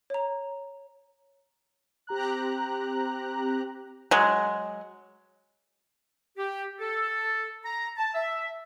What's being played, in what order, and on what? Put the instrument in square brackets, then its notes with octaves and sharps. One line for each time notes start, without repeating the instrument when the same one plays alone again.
[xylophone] C#5 A#5
[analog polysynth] C4 G4 A#5 F#6
[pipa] F#3 G#3
[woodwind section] G4
A4
A#5
A5
E5